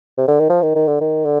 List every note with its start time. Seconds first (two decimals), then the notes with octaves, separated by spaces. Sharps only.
0.18 C3
0.28 D3
0.40 D#3
0.49 F3
0.62 D#3
0.75 D#3
0.88 D3
1.01 D#3
1.25 D3